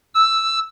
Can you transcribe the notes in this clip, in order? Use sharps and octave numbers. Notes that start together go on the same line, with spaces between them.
E6